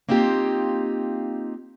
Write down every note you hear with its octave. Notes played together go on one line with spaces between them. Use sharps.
A#3 C4 D#4 F4 G4